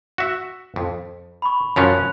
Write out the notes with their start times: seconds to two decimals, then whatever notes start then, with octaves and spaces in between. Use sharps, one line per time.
0.18 F#4 E5
0.76 F2
1.42 B5 C#6
1.76 F#2 F3 C#4 F#6 F7